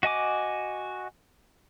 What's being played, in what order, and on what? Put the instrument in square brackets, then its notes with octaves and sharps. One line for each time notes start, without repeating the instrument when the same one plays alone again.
[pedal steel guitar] F#4 D#5 G#5 D6